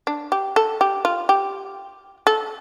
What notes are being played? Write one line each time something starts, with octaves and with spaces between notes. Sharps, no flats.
D4
G4
A4
G4
F4
G4
A4